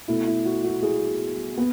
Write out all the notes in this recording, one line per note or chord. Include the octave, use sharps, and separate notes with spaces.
B2 A3 E4
E4
F#4
F#4
E4 G#4
B3